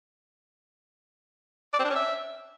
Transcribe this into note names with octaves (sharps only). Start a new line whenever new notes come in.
D5
C4
D4
C#4
E5